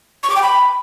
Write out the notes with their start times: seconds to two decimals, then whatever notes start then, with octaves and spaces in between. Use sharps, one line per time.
0.23 C#6
0.30 D6
0.36 G5
0.42 B5